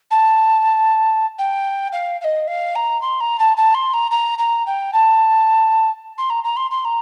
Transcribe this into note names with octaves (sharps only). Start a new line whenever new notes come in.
A5
G5
F5
F5
D#5
F5
A#5
C6
A#5
A5
A5
C6
A#5
A#5
A#5
G5
A5
C6
A#5
A#5
C6
C6
A#5